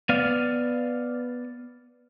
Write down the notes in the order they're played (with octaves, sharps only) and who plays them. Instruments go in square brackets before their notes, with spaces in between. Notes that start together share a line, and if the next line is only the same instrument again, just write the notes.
[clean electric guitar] B3 D5 F5